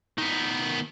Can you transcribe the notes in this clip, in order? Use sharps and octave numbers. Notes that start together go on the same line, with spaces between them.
D#3 B3